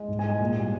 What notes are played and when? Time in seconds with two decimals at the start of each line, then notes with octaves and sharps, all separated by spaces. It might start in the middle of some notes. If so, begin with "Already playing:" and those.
Already playing: G#3
0.08 G#2
0.19 G#5
0.24 G#3
0.30 G#5
0.40 A#2
0.57 G3